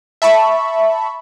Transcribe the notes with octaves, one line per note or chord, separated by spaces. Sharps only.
E5 A5 B5 C#6